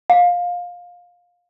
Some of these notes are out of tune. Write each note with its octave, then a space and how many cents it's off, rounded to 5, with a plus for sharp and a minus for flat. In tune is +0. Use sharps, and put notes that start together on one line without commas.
F5 +20